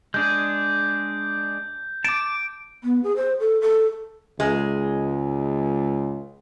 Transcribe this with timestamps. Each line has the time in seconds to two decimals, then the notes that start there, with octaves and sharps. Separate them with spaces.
0.14 G#3 D4 G#4 G6
2.04 A5 D6 D7
2.84 B3
3.04 G#4
3.16 C5
3.40 A4
3.61 A4
4.40 C#2 G#3